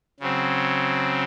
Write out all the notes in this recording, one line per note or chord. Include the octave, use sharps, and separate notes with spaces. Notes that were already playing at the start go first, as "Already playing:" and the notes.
C#3 F#3 C4